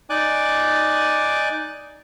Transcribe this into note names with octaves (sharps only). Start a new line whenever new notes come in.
D#4 D5 G#5 D6 F#6